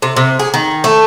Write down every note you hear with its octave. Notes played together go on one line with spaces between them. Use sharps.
C3
C3
G#4
D#3
A3